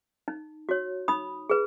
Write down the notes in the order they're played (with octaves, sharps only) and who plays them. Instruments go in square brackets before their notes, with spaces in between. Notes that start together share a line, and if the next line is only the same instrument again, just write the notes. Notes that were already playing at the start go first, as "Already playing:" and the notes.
[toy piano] D#4
F#4 C#5
D#4 B5 D#6
G#4 B4